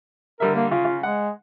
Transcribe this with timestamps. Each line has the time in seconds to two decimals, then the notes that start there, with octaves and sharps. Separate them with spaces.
0.40 D3 G3 A#4 E5
0.55 A#3
0.72 C#3 F4
0.85 C#3
1.03 G#3 F#5